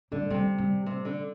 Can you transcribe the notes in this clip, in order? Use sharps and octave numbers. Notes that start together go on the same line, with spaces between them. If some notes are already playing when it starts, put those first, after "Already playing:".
D3 G3
C3 G3
G3
C3
D3